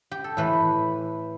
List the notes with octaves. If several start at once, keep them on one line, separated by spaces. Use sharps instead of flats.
G4
A4
A2 E3 A3 B4